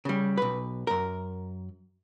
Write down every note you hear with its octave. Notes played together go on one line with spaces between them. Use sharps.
C#3 G3
B1 B4
F#2 A#4